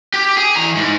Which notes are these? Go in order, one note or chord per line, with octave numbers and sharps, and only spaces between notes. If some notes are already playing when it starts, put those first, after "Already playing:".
G4
G#4
E3 A#5
G#2